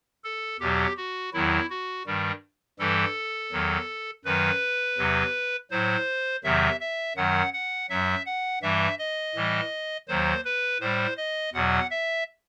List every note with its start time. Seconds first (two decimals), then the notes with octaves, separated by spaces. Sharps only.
0.24 A4
0.60 E2 B2 F#3 G4
0.97 F#4
1.33 E2 D#3 F#3 E4
1.70 F#4
2.07 G2 D#3 G3
2.79 G2 E3 G3 A4
3.52 E2 D#3 F#3
4.25 F#2 D#3 F#3 B4
4.98 E2 C3 F#3
5.71 A2 F#3 C5
6.44 E2 C3 D#3 F#3 E5
6.80 E5
7.16 F#2 D#3 F#3 F#5
7.53 F#5
7.89 F#2 F#3 E5
8.26 F#5
8.62 G2 E3 G3 E5
8.99 D#5
9.35 A2 E3 G3
10.08 D#2 D#3 F#3 C5
10.45 B4
10.81 A2 G3 C5
11.17 D#5
11.54 E2 B2 F#3 F#5
11.91 E5